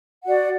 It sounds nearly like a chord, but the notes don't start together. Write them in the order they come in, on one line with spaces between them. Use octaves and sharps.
F#5 F#4 D5